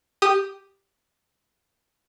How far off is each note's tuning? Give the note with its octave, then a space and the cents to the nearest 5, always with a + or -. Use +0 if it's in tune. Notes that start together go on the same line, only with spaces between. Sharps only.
G4 +0 D#6 -15